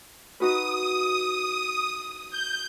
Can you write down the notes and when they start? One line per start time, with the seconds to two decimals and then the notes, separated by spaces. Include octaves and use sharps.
0.40 D#4 F#4 B4 D#6
2.31 G6